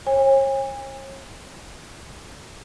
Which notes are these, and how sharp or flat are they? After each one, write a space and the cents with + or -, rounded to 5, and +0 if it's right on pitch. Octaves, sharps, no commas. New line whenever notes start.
C#5 -40 G#5 -40